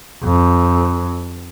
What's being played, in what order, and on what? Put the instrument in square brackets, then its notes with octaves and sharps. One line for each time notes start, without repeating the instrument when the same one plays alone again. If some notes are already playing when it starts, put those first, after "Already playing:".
[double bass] F2